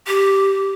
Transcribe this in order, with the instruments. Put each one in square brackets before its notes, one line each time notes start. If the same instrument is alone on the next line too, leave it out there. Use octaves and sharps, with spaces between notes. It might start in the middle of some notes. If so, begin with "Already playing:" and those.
[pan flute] G4